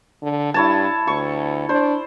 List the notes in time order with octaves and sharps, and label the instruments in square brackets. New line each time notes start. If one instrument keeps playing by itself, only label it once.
[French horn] D3
[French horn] G2 [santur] E4 C#5 A5
[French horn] D2 [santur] C#6
[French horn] D4 [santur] C5